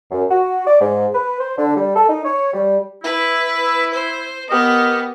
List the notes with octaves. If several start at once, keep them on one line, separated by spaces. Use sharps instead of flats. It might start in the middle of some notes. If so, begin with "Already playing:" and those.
F#2
F#4
D5
G#2
B4
C5
D3
G3
A4
D#4
C#5
G3
E4 B4
C5
B3 G4 A#4 D#5